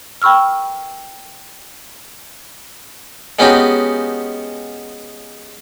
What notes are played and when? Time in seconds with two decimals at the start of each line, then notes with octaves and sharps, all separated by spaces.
0.22 G5 B5 C#6 E6 F6
3.39 G#3 B3 C#4 D#4 F#4 G4